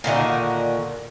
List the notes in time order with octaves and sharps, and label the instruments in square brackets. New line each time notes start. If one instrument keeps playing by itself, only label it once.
[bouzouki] A#2 D3 D#3 F#4